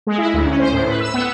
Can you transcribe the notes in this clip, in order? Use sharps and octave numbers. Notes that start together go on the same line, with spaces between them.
G#3
E4
D2
C#4
C5
A2
B4
E6
B3